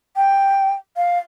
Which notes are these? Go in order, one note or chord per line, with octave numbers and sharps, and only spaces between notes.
G5
F5